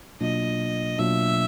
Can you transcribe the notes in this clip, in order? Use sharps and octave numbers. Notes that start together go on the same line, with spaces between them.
B2 F#3 A#3 D4 F4 D#5
B2 F#3 A#3 D4 F4 E5